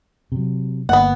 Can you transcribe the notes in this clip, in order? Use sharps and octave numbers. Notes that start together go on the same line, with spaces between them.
C3 F#3
G1 A#3 B3 F#5